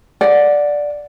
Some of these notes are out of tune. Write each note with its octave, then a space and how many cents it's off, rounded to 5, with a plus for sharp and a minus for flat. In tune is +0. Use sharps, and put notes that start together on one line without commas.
D5 +0 F#5 -15